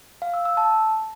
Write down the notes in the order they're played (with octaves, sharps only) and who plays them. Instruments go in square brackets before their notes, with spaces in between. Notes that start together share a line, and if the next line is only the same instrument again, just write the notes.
[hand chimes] F5
E6
E6
A5